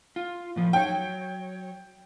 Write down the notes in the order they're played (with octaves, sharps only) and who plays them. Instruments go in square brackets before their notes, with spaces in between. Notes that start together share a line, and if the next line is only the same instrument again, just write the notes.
[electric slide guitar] F4
A2 F3
[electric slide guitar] F#3 C#5 [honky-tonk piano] G5